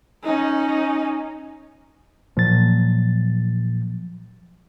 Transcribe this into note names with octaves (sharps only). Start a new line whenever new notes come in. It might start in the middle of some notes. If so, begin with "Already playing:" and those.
C#4 D#4
A#2 F3 F#3 A6